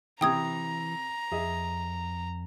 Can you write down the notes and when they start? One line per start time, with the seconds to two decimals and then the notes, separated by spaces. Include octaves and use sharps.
0.21 C3 E3 C4 E4 G5 A#5 D#6 G#6
1.32 F2 G#4 D#5 E5